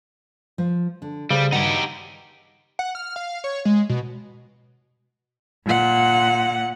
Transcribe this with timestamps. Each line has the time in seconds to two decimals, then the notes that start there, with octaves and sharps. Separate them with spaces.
0.58 F3
1.02 D3
1.31 C#3 G3 A4 C5
1.52 G2 D#3 D#4 F#4 G4 F#5
2.79 F#5
2.95 F6
3.16 F5
3.44 C#5
3.65 G#3
3.89 B2
5.66 A#2 F#5